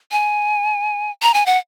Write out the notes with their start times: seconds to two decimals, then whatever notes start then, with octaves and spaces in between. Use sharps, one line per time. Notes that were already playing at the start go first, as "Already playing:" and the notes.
0.12 G#5
1.22 A#5
1.34 G#5
1.46 F#5